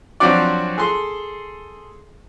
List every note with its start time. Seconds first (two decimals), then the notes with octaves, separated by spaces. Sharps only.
0.20 F3 F#3 C4 D4 F#4 D5
0.78 G#4 A4 C6